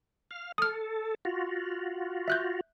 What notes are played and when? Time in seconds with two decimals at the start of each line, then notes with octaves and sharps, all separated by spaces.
0.31 F5
0.58 A4 D#6 F6
1.25 F4 F#4
2.28 E5 F#6 G6